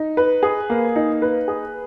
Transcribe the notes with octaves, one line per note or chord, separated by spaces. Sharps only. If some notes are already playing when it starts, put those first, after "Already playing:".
Already playing: D#4
B4
G#4
A#3
D#4
B4
G#4